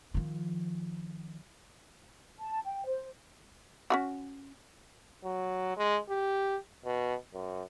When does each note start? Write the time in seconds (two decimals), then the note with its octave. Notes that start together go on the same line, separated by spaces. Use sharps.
0.14 D#3 F3
2.39 A5
2.65 G5
2.86 C5
3.90 C#4 F4 F#4
5.25 F#3
5.77 G#3
6.10 G4
6.85 B2
7.33 F#2